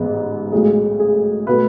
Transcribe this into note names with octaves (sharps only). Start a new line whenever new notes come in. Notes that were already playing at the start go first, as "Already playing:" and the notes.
Already playing: A1 G#2 G#3 B3
B1 A2 G#3
G#4
B2 A3 B4